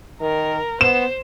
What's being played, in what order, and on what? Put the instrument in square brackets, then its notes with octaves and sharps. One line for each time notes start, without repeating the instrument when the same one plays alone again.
[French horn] D#3 [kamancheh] A#4
[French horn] B3 [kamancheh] C5 [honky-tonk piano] E7